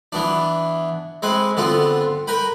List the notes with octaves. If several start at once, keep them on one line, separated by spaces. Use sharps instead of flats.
E3 B3 D4
G#3 C4 B4
D3 B3 C4 F4
A#4 B4 G5 B5